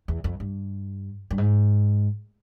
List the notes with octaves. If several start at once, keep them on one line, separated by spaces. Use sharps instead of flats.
E2
F2
G2
G2
G#2